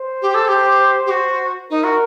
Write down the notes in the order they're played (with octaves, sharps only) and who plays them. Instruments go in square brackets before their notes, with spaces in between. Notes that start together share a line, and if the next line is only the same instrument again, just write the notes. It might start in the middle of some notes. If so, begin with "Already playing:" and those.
Already playing: [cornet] C5
[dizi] G4
A4
G4
G4
F#4
[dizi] D#4 [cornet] A#4
[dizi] F#4